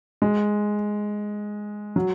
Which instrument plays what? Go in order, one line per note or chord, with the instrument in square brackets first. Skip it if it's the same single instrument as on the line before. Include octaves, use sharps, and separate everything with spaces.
[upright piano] G#3
F#3